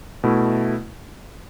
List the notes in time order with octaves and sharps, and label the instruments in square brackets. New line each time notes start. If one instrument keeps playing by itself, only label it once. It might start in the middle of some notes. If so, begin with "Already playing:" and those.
[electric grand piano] B2 A3 E4